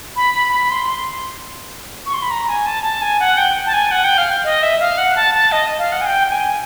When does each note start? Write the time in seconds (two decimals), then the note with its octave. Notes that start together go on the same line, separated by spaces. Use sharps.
0.16 B5
0.34 B5
0.52 B5
0.70 C6
0.87 C6
2.06 C#6
2.14 C6
2.22 B5
2.31 A#5
2.49 G#5
2.66 A5
2.84 A5
3.02 G#5
3.20 F#5
3.38 G5
3.66 A5
3.73 G#5
3.91 F#5
4.04 G5
4.18 F5
4.44 D#5
4.63 E5
4.80 F5
4.98 F#5
5.16 A5
5.34 A5
5.52 D#5
5.78 F5
5.92 F#5
6.01 G#5
6.06 G5
6.28 G5
6.32 G#5